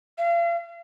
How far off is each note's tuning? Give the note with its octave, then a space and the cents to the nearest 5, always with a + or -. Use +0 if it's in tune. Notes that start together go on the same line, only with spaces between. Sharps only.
F5 -40